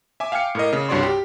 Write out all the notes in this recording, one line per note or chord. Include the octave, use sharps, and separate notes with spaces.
E5 G#5 D6
F5 G5 G#5 F6 C#7
A2 A#4 D#5
C#3
C2 G2 F#4 C#5 D5 C6
G4